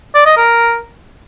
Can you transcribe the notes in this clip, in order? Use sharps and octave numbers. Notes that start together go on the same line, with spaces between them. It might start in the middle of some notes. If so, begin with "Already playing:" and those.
D5
D#5
A#4